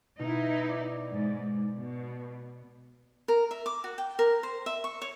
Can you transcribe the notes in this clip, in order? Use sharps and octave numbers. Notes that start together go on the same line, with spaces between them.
B2 D#4 E4
D5
G#2
B2
A#4
E5
D6
F#4
G5
A#4
C5
E5
C#6
C#5